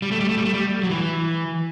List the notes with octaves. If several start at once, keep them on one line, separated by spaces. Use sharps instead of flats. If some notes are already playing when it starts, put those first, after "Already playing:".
G3
A3
G3
A3
G3
A3
G3
F#3
E3